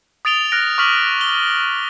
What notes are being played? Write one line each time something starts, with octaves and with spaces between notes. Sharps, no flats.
D#6 A6 D7 F7 G7
F6 F#6 A#6 D7
C#6 D6 F6 B6 F#7
G7